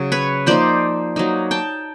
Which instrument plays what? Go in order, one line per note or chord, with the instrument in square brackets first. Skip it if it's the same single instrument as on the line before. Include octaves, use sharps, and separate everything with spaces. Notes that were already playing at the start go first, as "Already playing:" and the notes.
Already playing: [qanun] C#3 F#3
B4 C#5
F3 A#3 D#4 C5 D5
F#3 A#3 D#4
G5 A5